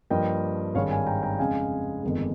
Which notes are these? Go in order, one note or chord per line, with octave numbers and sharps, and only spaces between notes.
G2 F3 A#3 D#5 G5
G#1 G2 D#3 G#3 C#5 F5
F5 G#5
G5 A#5
G5 A#5
F2 C#3 G#3 F5 G#5
G1 F2 D#3 G#3